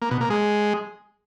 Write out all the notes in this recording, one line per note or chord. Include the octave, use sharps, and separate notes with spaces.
A#3
B2
A#3
G#3